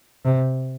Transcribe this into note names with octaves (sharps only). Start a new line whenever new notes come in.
C3